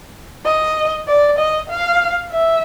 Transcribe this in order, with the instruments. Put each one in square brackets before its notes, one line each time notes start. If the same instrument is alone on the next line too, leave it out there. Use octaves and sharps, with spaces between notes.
[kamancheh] D#5
D5
D#5
F5
E5